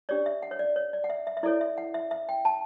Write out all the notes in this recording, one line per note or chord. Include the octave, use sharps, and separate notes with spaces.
D4 G4 C#5 D5
E5
F#5
C#5
D5
C#5
D5
F#5
E5
E5
E5
E4 A4 C#5 D5
E5
F#5
E5
E5
G5
A5